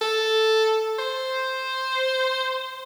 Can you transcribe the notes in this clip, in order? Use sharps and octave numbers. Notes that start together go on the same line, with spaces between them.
A4
C5